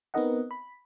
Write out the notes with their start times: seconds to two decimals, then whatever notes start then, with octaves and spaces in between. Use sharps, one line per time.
0.14 B3 C4 D#4 A#4 D#5 F#5
0.51 B5